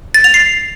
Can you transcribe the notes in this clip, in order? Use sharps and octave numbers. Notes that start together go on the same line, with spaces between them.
A6
F7
C7